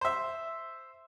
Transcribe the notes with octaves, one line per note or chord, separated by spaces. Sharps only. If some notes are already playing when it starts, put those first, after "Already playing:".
C5 E5